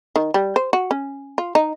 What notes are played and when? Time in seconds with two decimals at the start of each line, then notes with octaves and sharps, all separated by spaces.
0.16 D#3
0.34 G3
0.56 C5
0.73 F#4
0.91 C#4
1.38 F4
1.55 D#4